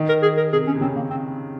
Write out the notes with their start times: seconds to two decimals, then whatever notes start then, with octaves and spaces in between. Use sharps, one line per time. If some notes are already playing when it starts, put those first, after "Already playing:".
Already playing: D#3
0.09 A#4
0.22 G#4
0.37 A#4
0.53 C3 G#4
0.67 C#4
0.75 C3
0.81 C#3 C4
0.96 A#3
1.10 C4